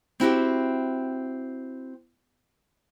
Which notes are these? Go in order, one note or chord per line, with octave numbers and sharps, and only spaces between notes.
C4 E4 F#4 G4